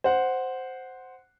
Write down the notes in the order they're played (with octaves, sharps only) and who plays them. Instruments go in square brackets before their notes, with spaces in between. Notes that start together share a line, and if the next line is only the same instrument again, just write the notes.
[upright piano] C5 F#5